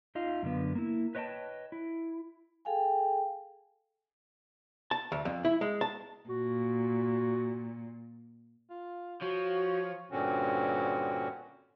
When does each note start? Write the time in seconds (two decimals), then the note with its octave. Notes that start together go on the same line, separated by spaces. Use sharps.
0.15 D#4 F4 D#5 F5
0.43 F#2 D3 B3
0.75 A#3 E4
1.15 B4 C#5 D#5 F#5 G5 A5
1.72 E4
2.65 G#4 A4 F5 G5 G#5
4.91 A5
5.12 D2
5.25 F2
5.45 E4
5.61 G#3
5.81 A5
6.29 A#2 F#4
8.70 F4
9.22 F3 F#4 C#5
10.11 G2 A#2 D3 C4 C#4 F#4